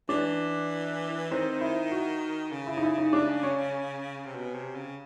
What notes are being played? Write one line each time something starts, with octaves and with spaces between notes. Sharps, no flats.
E3 D4
D#3 C4
E4
F#4
C#3
E4
D#4
E4
D#4
D4
C#4
C3
B2
C3
C#3